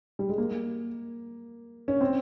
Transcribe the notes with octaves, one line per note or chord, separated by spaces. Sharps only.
G3
G#3
A#3
C#4
C4